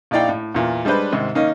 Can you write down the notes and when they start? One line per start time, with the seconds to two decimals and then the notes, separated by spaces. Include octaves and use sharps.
0.11 A#1 D#4 E4 D5 F5 G5
0.29 A2
0.54 E2 A#2
0.85 G3 G#3 D4 B4 C5
1.12 G#2 C3 D#3
1.35 D#3 A#3 C#4 D#4